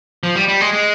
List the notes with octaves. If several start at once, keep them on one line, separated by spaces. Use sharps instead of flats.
F3
G3
G3
G#3
G#3